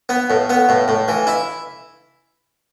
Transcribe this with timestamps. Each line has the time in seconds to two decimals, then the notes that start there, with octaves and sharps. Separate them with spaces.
0.09 B3
0.30 A2
0.50 B3
0.69 A2
0.88 A2
1.08 E3
1.27 E4